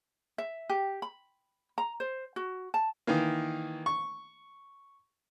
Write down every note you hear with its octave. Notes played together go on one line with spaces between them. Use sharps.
E5
G4
B5
A#5
C5
F#4
A5
D#3 E3 A#3
C#6